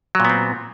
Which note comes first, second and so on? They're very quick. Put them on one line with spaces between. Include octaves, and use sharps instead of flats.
F#3 A#2 B3 C4